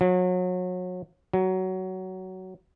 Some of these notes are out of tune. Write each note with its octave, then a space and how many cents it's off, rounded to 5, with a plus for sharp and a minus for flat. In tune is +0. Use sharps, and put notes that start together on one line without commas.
F#3 -30
F#3 +15